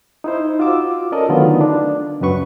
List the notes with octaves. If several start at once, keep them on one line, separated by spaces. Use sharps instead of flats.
D#4 E4 C5
F4 F#4 D6 E6
C#4 A4 A#4 D5 D#5 A5
D3 D#3 F#3 A3 B3 F4
D4
C#2 F#2 F#3 B4 C#6